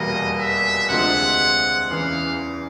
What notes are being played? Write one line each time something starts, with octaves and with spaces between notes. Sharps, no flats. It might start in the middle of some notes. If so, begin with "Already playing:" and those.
Already playing: F1 E2 B2 G3 A#3 D#5
E5
D2 C3 F3 G#3 F#5
E2 C#3 E3 F5